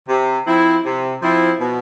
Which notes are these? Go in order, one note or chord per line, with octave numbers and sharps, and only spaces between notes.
C3
F3 C4 E4
C3
F3 C4 E4
B2